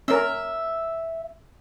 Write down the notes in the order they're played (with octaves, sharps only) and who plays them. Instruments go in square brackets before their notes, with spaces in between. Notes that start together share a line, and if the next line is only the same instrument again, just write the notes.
[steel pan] C#4 A#4 [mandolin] E5